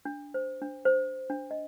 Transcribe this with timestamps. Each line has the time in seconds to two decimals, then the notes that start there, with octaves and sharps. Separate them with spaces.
0.05 D4
0.34 C5
0.61 D4
0.85 C5
1.30 D4
1.51 D#5